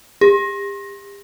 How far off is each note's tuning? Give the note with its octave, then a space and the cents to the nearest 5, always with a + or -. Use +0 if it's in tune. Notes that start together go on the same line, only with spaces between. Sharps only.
G4 +40